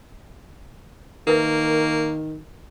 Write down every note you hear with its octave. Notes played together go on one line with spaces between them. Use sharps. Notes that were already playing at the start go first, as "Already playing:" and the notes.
D#3 A#3 A#4 B4 E5